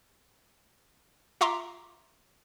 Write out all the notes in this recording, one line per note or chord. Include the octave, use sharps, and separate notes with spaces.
F4 E5 A#5 C6 D6